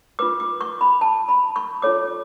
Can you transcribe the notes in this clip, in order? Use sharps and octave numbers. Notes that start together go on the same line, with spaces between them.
F4 B4 D6
D6
C#6
B5
A5
B5
C#6
F4 A4 C#5 D6